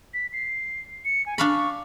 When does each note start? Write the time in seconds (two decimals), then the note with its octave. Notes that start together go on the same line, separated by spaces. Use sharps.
0.14 B6
0.33 C7
1.05 C#7
1.26 G#5
1.38 D4 F5 B5 C#6